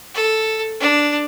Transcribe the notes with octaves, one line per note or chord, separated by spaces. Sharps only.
A4
D4